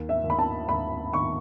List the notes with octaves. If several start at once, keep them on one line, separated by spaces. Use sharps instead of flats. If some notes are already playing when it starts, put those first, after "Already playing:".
Already playing: D#2
E5
D#2
B5
A5
D#2 B5
D#3 C#6